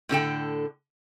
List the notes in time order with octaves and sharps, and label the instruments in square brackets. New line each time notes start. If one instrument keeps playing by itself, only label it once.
[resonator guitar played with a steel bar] A2 D3 A4 G5